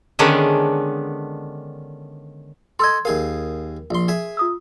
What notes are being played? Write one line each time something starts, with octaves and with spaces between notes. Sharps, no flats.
D3 D#3 G#3 B3 C#4 D4
A4 D#5 C6 E6 G#6
D#2 G#4 A#4 F5
A#1 C6
G#4 E5
F4 D#6 E6